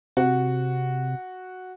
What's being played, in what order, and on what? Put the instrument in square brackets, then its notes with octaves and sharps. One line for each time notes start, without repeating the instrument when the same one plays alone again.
[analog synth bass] C3 [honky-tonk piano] F#4